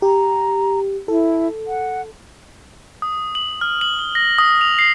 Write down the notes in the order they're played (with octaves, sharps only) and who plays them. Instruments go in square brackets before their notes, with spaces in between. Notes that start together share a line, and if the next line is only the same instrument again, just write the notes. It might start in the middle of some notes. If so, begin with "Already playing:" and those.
[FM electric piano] G4 [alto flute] A#5
[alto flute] E4 [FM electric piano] A4
[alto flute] F#5
[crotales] D#6
F#7
F6
F#7
G7
A#6
D#6
F7
C7